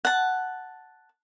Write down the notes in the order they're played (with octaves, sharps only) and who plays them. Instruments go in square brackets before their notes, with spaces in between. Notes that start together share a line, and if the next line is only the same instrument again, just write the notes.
[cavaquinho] F#5 A5